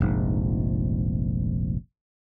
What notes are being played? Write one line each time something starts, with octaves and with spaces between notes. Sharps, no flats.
F1 A#1 G#2